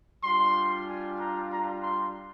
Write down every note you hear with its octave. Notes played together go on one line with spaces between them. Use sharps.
G3 D4 F4 C6
G#5
A#5
A#5
C6